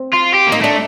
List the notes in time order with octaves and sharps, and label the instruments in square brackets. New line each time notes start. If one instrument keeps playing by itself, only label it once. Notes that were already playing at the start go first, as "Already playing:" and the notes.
Already playing: [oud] C4
[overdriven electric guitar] F4
G4
[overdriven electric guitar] A#3 [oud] D#4
[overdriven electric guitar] A3 [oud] D4